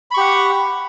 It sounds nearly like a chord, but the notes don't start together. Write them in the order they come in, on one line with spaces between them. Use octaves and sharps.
B5 C#6 G4 F#5